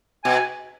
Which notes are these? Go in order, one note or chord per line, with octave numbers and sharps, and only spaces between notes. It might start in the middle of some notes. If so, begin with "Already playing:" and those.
B2 G#5